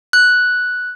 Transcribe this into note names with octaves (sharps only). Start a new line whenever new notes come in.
F#6